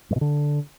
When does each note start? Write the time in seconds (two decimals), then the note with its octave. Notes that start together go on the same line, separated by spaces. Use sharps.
0.11 G2
0.16 B2
0.21 D3